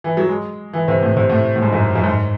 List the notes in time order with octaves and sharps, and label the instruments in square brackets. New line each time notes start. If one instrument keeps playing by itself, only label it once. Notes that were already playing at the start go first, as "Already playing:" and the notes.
[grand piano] E3
F#3
G#3
E3
C3
A2
C3
A2
A2
G#2
F#2
F#2
G#2